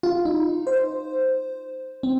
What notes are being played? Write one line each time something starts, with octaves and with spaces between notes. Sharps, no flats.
F4
D#4
C5
C4